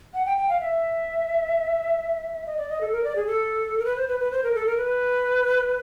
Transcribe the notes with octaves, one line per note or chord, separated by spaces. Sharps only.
F#5
G5
G5
F5
E5
D#5
D5
D#5
A4
A#4
D5
G#4
A4
A#4
B4
C5
B4
B4
C5
A#4
A4
A#4
B4